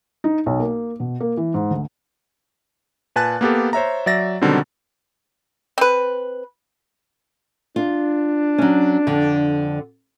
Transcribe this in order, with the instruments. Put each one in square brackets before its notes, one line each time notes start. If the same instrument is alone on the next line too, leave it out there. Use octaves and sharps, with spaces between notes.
[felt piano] D#4
B1
A#3
B2
A#3
E3
G#2
D2
[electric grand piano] A#2 B4 G#5 A5 F#6 A6
A#3 B3 G4 A4
C5 C#5 E5 A#5
F#3 D5 E5 A6 A#6
B2 D3 D#3 F#3 G3 C4
[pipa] C4 B4
[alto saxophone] D4 [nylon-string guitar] F4
[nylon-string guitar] F#3 C#4
F2 D3